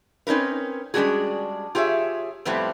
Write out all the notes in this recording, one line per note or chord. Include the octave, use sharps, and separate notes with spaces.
C4 C#4 D#4 A#4 B4
G3 G#3 C#4 D4 F#4 G#4
F4 G4 G#4 C#5 E5
F2 A2 G3 A3 B3 C4